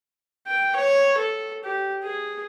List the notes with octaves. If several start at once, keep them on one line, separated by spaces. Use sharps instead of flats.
G5
C#5
A4
G4
G#4